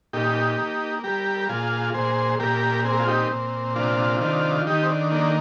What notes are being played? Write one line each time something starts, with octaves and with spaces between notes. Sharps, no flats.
A#2 D#4 G4
A#3
G3 G4 A#4
A#4
A#2 F4 G#4
A#2 G#4 C5
A#2 G4 A#4
C4 G#4
A#4
F4 G#4
D#4 G4
A#2
C3 D4 F4
D#3 D4 F4
D#3 D#4 G4
C4
D4
A#3 D4